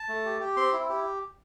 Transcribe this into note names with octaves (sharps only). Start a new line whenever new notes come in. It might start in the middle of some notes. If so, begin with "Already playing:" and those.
Already playing: A5
A3
G4
G4
C4 C6
E4
G4